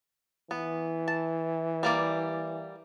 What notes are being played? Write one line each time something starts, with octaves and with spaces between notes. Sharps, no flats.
E3 B3
A5
G3 A#3 D5